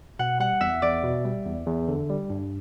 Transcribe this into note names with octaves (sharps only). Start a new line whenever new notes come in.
B2 F#5
G3 F#5
E2 E5
E2 D5
B2
G3
E2
E2
D3
G3
G2